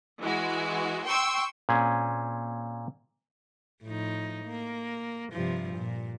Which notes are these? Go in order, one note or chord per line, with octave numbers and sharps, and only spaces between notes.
E3 G#3 F#4
G5 C6 C#6 E6
A#2 C4 C#4 G#4
A2 F3 D#4
A#3
G2 C3 F3
A#2